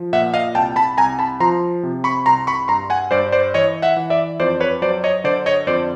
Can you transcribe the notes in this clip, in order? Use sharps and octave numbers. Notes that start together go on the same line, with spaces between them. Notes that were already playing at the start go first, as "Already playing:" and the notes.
Already playing: F3
A#2 E5 F#5
D#5 F5
C2 G5 A5
A5 B5
C2 G#5 A#5
A5 B5
F3 A#5 C6
C3
B5 C#6
C2 A#5 C6
B5 C#6
G2 A#5 C6
F#5 G#5
G2 C5 D5
C5 D5
E3 C#5 D#5
E5 F#5
E3
D5 E5
F2 C5 D5
B4 C#5
F#3 C5 D5
C#5 D#5
D3 C5 D5
C#5 D#5
F2 C5 D5